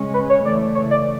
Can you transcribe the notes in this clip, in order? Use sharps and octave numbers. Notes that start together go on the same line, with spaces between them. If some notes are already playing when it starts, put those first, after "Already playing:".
Already playing: C#3 G#3 C#4
B4
C#5
C#3 E3 A3 D5
C#5
D5